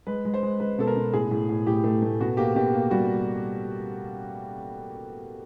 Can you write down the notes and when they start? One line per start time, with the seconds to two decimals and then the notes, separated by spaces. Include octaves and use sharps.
0.07 G#3 B4
0.25 G#3
0.34 C5
0.43 G#3
0.60 G#3 B4
0.78 B2 A4
0.87 A#4
0.96 B2
1.13 A2 G#4
1.31 A2
1.49 A2
1.66 A2 G4
1.84 A3
2.02 A3
2.20 B2 F#4
2.37 A#3 G4
2.56 B2 G4
2.74 A#3
2.91 G3 F#4